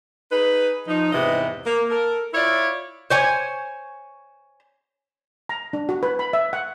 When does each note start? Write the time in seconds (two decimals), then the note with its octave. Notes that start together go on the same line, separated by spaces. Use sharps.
0.31 D#4 G#4 B4
0.88 F3 D#4
1.12 E2 G#2 C3 B4 D#5
1.66 A#3
1.90 A4 A#4
2.33 E4 F4 C#5 D5 E5
3.10 C5 C#5 G#5
5.49 A#5
5.73 D4
5.89 F#4
6.03 B4
6.19 B5
6.33 E5
6.53 F#5